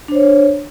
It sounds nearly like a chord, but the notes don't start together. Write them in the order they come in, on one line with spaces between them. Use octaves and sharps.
D4 C5 C#5